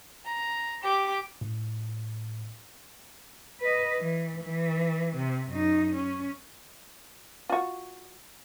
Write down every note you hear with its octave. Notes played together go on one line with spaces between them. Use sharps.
A#5
G4 D6
A2
B4 D#5
E3
E3
C3
F#2 D#4
C#4
F4 F#4